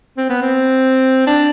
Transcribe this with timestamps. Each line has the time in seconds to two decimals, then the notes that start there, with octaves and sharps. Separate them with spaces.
0.17 C4
0.29 B3
0.42 C4
1.27 D4